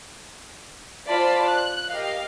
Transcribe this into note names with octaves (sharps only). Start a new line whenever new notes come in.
F4 C5 D5 A5 B5
F#6
G4 A#4 D#5 F5